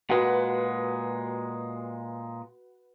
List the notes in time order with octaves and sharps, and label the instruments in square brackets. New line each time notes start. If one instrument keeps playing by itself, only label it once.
[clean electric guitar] A#2 G#3 [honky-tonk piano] F#4 B4 F#5